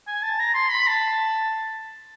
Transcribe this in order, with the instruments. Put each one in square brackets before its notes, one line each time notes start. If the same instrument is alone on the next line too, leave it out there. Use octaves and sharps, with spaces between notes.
[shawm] G#5
A5
A#5
C6
B5
A5